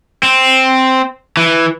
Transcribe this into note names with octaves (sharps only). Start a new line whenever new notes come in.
C4
E3